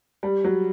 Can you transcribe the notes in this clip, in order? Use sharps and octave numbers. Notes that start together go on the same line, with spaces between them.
G3
F#3